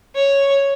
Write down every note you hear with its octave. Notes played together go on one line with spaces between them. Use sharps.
C#5